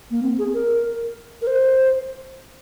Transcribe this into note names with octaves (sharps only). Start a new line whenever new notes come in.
A#3
C4
G#4
A#4
A#4
C5